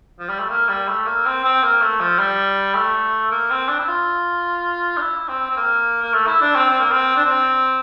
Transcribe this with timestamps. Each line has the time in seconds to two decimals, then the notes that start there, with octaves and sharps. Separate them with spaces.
0.20 F3
0.29 G3
0.39 A3
0.49 A#3
0.69 G3
0.88 A3
1.06 A#3
1.26 C4
1.44 C4
1.63 A#3
1.81 A3
2.00 F3
2.19 G3
2.75 A3
3.31 A#3
3.50 C4
3.68 D4
3.79 E4
3.88 F4
4.96 D4
5.01 E4
5.29 C4
5.50 C4
5.56 A#3
6.02 A#3
6.13 A3
6.27 E4
6.41 D4
6.55 C4
6.69 C4
6.79 A#3
6.91 C4
7.16 D4
7.25 C4